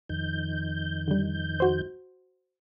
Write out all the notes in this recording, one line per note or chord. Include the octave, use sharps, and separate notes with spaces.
F2 D#3 G6
D3 G3
F#4 C5